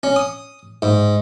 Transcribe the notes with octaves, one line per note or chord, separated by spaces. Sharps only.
C#4
D#6
G#2